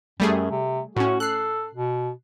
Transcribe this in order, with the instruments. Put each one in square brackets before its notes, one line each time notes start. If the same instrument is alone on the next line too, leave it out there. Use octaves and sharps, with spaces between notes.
[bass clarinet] F#2 [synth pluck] G3 A3 G#4
[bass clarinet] C3
[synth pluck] A2 C#4 [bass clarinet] F#4
[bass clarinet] A4 [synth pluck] F#6 C7
[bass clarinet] B2